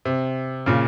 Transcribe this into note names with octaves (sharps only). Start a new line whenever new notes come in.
C3
A#2 C#3